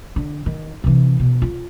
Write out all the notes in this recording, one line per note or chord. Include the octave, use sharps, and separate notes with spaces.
D3
D#3
C3 E3
B2
F4